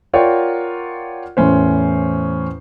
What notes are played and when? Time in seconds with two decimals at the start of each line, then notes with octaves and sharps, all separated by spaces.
0.14 F4 A#4 C#5 D5 F#5 G5
1.37 E2 A2 C#4 C5